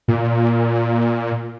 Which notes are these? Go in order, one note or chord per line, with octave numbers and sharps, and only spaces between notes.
A#2